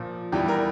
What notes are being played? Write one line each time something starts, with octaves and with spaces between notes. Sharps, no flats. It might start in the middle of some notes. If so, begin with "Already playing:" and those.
Already playing: A#2 F3
E2 E3 G3 G4
A#4